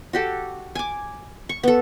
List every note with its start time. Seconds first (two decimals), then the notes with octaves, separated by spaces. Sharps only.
0.13 F#4 G4 A4
0.75 G#5 D6
1.49 C#6
1.63 B3 A4